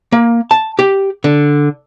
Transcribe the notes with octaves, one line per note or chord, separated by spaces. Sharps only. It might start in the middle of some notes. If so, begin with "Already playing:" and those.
A#3
A5
G4
D3